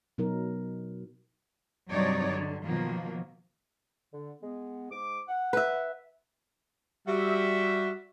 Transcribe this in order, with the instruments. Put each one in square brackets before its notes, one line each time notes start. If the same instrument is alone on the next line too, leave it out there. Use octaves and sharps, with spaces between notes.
[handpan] B2 F#3 D#4 A#4
[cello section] G2 C3 F#3 D#4 C#5 D5
D3
B2 D#3 F3 F#3 A#3
[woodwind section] D3
G#3 B3
G#2 D6
F#5
[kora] B4 E5
[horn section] G3 F#4 E5